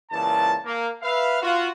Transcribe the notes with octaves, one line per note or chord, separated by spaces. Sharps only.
C#2 A#2 E3 A5
A#3
B4 E5 F5
F4 F#4